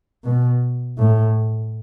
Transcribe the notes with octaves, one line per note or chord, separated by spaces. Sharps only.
B2
A2